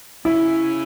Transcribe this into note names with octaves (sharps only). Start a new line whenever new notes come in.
C#3 C#4 E4